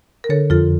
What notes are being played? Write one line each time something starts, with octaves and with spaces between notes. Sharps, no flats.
A#4
D3 A4 C#5
F2 F4 A4